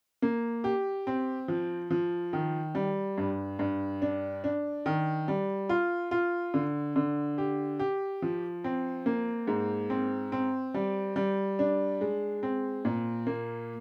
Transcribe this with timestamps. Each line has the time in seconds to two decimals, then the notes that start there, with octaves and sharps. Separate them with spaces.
0.22 A#3
0.64 G4
1.07 C4
1.48 F3
1.91 F3
2.33 D#3
2.75 G3
3.18 G2
3.59 G2
4.02 D4
4.44 D4
4.86 D#3
5.28 G3
5.69 F4
6.11 F4
6.54 D3
6.96 D3
7.38 G4
7.79 G4
8.22 F3
8.64 C4
9.06 A#3
9.47 G#2
9.90 C4
10.32 C4
10.74 G3
11.16 G3
11.59 D4
12.01 G#3
12.43 C4
12.85 A#2
13.27 A#3